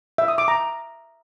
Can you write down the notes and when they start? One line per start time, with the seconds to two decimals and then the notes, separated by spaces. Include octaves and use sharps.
0.18 E5
0.28 D#6
0.38 D6
0.48 A#5